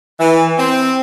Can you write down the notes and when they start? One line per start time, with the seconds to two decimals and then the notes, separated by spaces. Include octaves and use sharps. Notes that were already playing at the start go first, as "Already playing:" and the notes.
0.20 E3
0.58 C4